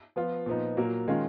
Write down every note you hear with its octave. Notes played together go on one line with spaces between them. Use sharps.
F3 B3 F4
A#2 F3 B3 D#4
A#2 F#3 A#3
D#3 G#3 C#4 F4